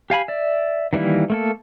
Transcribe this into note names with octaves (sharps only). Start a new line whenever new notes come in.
G4 F5 G#5 B5
D5 E5
D#3 E3 G3 A#3 E4
A3 A#3 A4